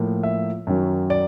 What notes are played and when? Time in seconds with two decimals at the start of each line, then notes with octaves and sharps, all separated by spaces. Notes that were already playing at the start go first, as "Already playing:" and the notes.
Already playing: A2 F3 A#3
0.23 E5
0.67 F#2 D#3 F#3
1.10 D5